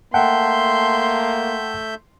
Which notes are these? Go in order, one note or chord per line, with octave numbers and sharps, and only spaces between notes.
A3 A#3 E5 F#5 G5 A5 C6 G6